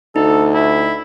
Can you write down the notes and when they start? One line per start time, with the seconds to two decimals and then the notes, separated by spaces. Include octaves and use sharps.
0.16 D2 D#4 A4
0.54 E4